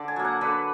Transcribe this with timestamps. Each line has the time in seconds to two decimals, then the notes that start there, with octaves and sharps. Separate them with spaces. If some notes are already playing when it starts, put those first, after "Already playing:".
Already playing: D3 D5
0.08 G#5
0.16 F#3 A#3
0.25 F#5
0.41 D3 B4